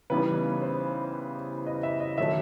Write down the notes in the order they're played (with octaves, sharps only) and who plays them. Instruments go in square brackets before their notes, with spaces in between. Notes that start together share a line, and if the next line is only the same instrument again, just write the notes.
[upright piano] C#3 E3 G3 B3 D#4 B4
C5
D#5
E5
D#5
D#3 F#3 A3 E5